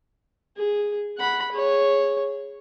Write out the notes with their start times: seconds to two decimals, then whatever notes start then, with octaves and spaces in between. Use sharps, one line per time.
0.57 G#4
1.18 F#5 B5
1.52 G#4 C#5